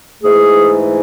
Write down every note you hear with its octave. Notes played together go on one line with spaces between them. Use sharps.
G#2 E3 A3 G#4